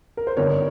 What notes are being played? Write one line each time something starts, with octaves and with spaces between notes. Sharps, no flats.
A#4
C5
G1 G2 D#3 A#4 C#5